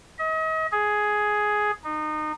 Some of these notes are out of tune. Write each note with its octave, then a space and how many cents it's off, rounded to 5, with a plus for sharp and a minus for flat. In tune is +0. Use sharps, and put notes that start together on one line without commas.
D#5 +40
G#4 +10
D#4 -25